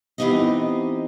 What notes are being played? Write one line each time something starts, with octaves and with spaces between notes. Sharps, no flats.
E3 B3 C4 D#4 G4 D#5